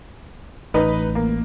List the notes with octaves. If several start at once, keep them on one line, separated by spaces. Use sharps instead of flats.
A1 D#4 B4
A#3